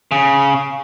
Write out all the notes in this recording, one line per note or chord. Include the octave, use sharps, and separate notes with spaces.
C#3